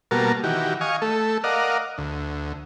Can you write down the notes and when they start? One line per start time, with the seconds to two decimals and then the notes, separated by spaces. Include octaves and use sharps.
0.11 B2 G3 A#3 F#4 A#4 A5
0.44 D#3 E3 F#4 G4
0.81 D#5 F5 G#5 C#6
1.02 A3 A4
1.44 A#4 D5 D#5 F5 F#5
1.98 D2